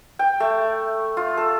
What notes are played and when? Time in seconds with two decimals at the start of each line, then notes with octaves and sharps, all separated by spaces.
0.19 G5
0.40 A3
1.17 F4
1.37 A4